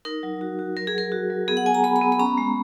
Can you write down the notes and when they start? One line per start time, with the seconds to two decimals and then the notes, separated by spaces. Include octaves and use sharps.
0.05 D#4 A#4
0.23 F#3
0.41 F#4
0.59 F#4
0.77 F#3 A#4
0.87 G#4
0.94 F#3 A#4
1.12 F#4
1.30 F#3
1.48 B3 G#4
1.57 F#5
1.66 B3 G#5
1.74 A#5
1.84 B3 B5
1.96 B5
2.01 B3
2.12 B5
2.19 C#4 A#5
2.38 G#3